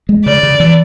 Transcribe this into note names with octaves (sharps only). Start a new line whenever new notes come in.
G#3
C#3 D5
C#3
E3